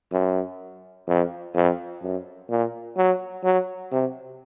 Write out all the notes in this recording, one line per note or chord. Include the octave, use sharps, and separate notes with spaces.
F#2
F2
F2
F#2
A#2
F#3
F#3
C3